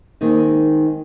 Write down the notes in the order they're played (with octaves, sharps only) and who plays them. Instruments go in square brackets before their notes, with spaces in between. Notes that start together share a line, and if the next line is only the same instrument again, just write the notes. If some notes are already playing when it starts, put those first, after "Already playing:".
[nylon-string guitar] D#3 G#3 A#3 C4 D#4